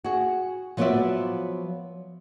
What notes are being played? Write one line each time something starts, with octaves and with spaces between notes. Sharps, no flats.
F#4 G#4
F3 F#3 B3 F4 D5 E5